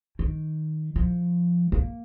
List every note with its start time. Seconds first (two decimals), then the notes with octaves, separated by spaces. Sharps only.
0.19 D#3
0.96 F3
1.72 A#3